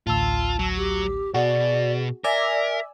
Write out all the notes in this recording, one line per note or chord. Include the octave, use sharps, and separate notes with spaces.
A1 D2 F4 A5 E6
F#3
G4
B2 F#4 G#4 D5
A#4 D5 E5 G#5 E6